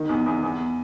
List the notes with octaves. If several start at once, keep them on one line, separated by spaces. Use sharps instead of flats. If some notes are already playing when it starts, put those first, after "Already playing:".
Already playing: D#3
E2
E2
E2